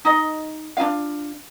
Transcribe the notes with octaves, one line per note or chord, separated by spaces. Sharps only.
D#4 D#5
D4 D#4 F4 F5